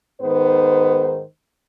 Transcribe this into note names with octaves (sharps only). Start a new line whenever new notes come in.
G#2 D#3 B3 C5